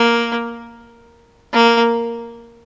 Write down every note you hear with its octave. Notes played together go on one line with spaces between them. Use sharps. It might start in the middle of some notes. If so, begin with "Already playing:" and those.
Already playing: A#3
A#3